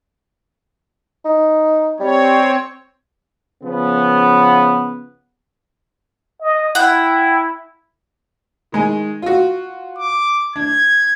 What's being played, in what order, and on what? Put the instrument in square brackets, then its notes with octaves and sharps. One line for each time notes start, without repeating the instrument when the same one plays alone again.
[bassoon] D#4
[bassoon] G3 [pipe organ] C4 C#5
[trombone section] C#3 F3 B3
[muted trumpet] D#5
[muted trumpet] E4 [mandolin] F#5 G5
[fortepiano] D#3 G#3 G#5
F4 F#4
[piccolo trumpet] D6
[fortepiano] D4 [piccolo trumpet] G#6